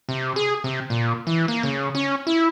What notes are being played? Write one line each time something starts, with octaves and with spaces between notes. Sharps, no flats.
C3
G#4
C3
A#2
E3
A#3
C#3
C#4
E4